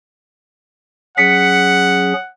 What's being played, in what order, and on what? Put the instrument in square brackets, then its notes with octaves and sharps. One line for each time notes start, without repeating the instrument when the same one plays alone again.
[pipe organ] F#3 C#4 G#4 [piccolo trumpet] F#5 [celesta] B6 C#7